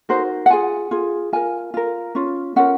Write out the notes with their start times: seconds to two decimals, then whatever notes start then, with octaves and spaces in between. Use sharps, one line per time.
0.09 D#4 F#4 A#4 C5
0.46 F#5
0.50 F4 G#4 G#5
0.91 F4 G#4
1.33 F4 A#4 G#5
1.74 F4 A#4
2.15 C#4 F4
2.56 C#4 F4 A#4 F#5